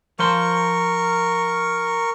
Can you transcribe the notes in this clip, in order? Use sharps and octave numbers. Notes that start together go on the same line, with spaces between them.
F3 A#4 C5 C6 C#6